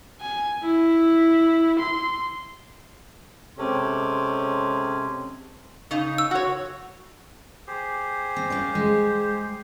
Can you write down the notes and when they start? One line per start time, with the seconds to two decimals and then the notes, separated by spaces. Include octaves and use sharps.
0.21 G#5
0.63 E4
1.79 C6
3.57 C3 G#3 C#4 A4 C6
5.91 C#3 D#4
6.18 E6
6.31 F#4 C#5
7.67 G4 G#4 C5
8.36 C4
8.50 A#3 C#4 D5
8.75 G#3